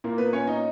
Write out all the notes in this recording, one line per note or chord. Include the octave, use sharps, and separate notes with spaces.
A#2 A#3 A#4
B3 B4
C#4 C#5
D#4 D#5